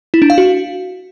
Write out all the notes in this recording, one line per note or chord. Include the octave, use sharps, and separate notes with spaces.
E4
D4
F5
F#4